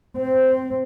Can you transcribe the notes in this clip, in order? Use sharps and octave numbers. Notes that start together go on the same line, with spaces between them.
C4 C5